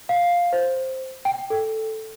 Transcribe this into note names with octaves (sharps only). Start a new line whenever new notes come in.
F5
C5
G5
A4